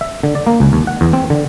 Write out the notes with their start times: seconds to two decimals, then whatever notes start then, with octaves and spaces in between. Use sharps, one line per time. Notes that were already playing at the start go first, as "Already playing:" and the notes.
0.01 E5
0.23 D3
0.35 D5
0.47 A#3
0.60 C#2
0.73 D#2
0.87 F#5
1.01 E2
1.13 C4
1.30 D3